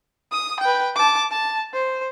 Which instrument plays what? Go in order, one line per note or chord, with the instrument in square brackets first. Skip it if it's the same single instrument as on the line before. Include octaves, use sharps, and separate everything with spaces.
[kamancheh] D#6
B4 G5
A5 D6
A5
C5